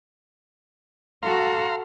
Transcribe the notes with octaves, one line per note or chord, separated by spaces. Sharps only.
F#4 A4 F5 A#5 C6